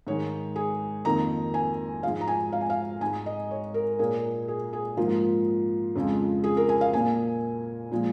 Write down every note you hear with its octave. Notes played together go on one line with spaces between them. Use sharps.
G#2 D#3 G#3 C#5
G#4
F2 D#3 A#3 A#5
G#5
G#2 F3 G#3 F5
A#5
G#5
F5
G#5
F5
G#2 G#3 G#5
D#5
C#5
A#4
A#2 A#3 G#4
G#4
G#4
G#2 F3 A#3 F4
F2 C#3 F3 G#3
G#4
A#4
G#5
F5
A#2 A#3 G#5
A#2 F3 G#3